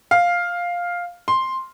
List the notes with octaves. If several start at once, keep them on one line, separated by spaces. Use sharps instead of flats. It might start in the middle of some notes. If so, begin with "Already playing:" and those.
F5
C6